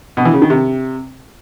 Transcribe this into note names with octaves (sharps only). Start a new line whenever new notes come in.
B2
E3
C#3
D#3
C3